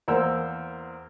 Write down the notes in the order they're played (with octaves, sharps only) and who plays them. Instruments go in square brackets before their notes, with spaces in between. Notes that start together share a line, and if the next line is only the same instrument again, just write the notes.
[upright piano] E2 A#3 A#4 C5 F#5 E6